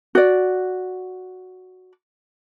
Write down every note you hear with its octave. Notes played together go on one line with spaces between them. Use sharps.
F#4 D5